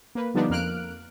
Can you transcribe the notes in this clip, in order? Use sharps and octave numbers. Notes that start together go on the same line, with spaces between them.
A#3 B4
D3 F3 G3 B3 D4 D#4
F2 A#3 F6 F#6 D7